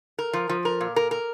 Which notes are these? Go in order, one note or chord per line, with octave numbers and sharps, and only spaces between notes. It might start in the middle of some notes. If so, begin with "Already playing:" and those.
A#4
F3
F3
A#4
A#2
A#4
A#4